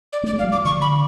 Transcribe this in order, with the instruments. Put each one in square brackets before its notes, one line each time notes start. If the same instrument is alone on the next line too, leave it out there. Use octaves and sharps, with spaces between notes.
[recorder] D5
[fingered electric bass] A3 [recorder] D5
[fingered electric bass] G#3
[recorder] F5
[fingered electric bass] F#3
[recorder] D6
[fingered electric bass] F3
[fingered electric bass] D3 [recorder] C#6
[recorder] B5